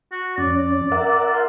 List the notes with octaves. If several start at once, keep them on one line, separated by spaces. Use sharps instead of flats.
F#4
F2 C#4 D5
A#4 E5 F#5
F4